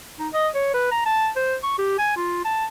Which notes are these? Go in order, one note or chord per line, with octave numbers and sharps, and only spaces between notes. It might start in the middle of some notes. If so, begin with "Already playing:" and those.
D#4
D#5
C#5
B4
A#5
A5
C5
C#6
G4
G#5
F4
A5